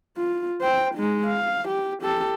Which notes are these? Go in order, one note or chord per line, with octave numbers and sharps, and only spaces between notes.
F4
C5 G5
G#3 D#4
F5
G4
G4 A4